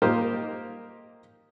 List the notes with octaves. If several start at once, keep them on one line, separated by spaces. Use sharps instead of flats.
A#3 D#4 F4 G4 A#4 C5